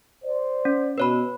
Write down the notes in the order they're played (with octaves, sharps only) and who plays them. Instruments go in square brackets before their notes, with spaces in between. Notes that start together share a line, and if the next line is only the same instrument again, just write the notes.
[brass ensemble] C5 D5
[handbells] C#4
[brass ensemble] B2 [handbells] B4 C#5 B5